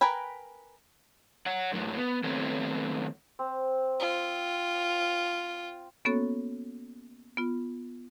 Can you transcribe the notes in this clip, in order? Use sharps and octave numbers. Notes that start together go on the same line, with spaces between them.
A#4 B4 G5 G#5 B5
C#5 F#5
F#2 A2 F#3
B3
D#3 F#3 A3 B3 C4 C#5
C4
F4
A#3 B3 C#4 F#4 A4 C#5
B3 F4